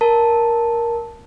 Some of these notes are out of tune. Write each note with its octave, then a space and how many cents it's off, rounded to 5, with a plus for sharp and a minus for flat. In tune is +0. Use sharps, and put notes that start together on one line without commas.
A#4 +5 A5 +5